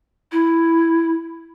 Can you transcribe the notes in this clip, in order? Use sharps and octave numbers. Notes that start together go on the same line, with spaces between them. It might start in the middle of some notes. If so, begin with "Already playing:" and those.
E4